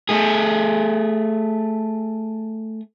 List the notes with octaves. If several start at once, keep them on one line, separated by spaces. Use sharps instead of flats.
A3 G#4